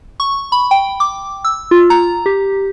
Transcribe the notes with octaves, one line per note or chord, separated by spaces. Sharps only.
C#6
B5
G5
D6
E6
F4
A#5
G4